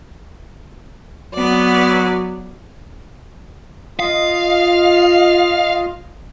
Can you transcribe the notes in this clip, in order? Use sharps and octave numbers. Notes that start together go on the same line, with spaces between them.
F#3 B3 D5
F4 D#5 F5